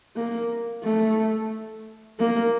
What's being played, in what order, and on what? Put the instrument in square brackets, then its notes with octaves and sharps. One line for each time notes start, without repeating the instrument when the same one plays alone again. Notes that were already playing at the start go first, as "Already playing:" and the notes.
[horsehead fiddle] A#3
A3
A#3